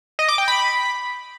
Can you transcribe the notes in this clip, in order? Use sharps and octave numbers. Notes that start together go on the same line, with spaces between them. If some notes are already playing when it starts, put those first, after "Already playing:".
D#5
D6
G5
B5